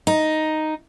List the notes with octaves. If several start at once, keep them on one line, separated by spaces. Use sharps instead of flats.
D#4